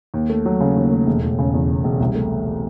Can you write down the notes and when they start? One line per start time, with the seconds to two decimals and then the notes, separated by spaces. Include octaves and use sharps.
0.14 D#2
0.30 A3
0.46 F#3
0.60 C#3
0.76 D#2
0.91 A3
1.06 E1
1.22 E1
1.39 C#3
1.54 E2
1.69 E1
1.84 E1
2.00 C2
2.15 A3